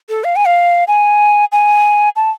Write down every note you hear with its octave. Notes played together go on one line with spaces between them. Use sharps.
A4
F5
G#5
F5
G#5
G#5
A5